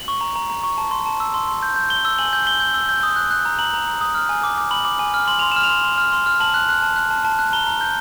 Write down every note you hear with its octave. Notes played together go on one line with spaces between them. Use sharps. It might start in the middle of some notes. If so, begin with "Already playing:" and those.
Already playing: F#7
C#6
A#5
A#5
A#5
C#6
A5
C6
A5
E6
C6
C6
G6
G6
G6 G7
E6
G#5 F#7
G6
G6 G7
G6
E6
G6
D#6
F#6
F#6
A#5
A#5 F#7
A#5
A#5
D#6
F6
G#5
D6
D6
B5 F#7
D6
G#5
F6
C6 F#7
C6 F7
F6 E7
F7
C6
C6
F6
C6
F6
A5 F#7
F#6
F#6
A5
F#6
A5
A5
F#6
A#5 G7
A#5
G6